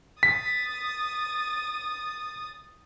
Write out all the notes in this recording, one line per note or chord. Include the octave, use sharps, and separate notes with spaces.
D#6 A6 B6